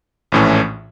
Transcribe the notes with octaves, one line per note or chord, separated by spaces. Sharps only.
A#1 A2 E3 A3 C#4